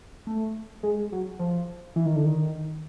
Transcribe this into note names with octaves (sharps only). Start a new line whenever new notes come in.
A3
G#3
F#3
F3
E3
D#3
D3
D#3